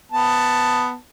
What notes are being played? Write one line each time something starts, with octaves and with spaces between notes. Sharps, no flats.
B3 A5